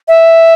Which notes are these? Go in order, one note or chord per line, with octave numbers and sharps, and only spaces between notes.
E5